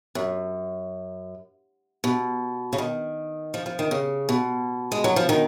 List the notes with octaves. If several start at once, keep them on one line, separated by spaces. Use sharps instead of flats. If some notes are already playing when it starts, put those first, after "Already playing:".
F#2
B2
C#3
D#3
F3
F3
D#3
C#3
B2
G#3
F#3
F3
D#3